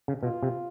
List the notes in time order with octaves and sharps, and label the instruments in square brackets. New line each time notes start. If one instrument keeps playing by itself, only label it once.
[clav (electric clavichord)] C#3
[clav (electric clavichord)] B2 [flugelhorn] F4
[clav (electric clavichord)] C3